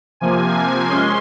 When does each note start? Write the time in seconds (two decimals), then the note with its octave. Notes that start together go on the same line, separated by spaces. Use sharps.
0.20 C3 F3 A#3 G#5
0.89 G#3 C#4 C6